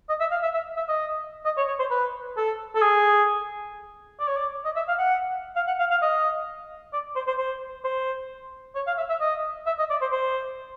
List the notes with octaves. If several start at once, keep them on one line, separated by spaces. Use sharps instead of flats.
D#5
E5
F5
E5
E5
E5
D#5
D#5
C#5
C#5
C5
B4
A4
A4
G#4
D5
C#5
D5
D#5
E5
F5
F#5
F5
F#5
F5
F5
D#5
D5
C5
C5
C5
C5
C#5
F5
E5
E5
D#5
E5
D#5
D5
C5
C5